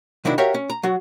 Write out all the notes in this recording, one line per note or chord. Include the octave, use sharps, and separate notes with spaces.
C3 D#3 F#3 D4 E4
F#4 G4 A#4 C#5 E5 F5
C#4
A#5
F#3 F#4